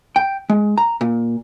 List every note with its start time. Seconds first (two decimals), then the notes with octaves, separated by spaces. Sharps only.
0.16 G5
0.50 G#3
0.78 A#5
1.01 A#2